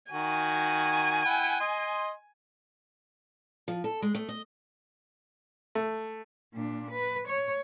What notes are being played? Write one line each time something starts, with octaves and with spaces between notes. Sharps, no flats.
D#3 F#4 G#5
E4 F#5 G5
D#5 C6
F3
A4
G#3
A3
D#5
A3
A#2 D4
B4
C#5